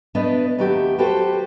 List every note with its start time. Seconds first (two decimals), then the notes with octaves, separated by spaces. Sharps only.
0.15 A3 B3 D4 B4 D#5
0.59 D#2 F#3 A3 G4
0.98 F#4 G4 A4 B4 C5